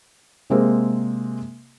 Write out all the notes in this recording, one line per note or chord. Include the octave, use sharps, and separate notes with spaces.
C3 G#3 A#3 C4